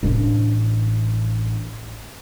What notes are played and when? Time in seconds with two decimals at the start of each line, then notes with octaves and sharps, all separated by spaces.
0.03 A1 D4